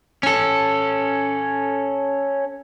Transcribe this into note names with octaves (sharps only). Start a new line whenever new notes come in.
C#4 A4